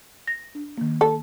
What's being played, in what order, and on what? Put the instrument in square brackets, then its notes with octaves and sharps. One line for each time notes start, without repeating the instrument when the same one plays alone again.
[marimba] A#6
D4
D#3 A#3
[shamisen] A4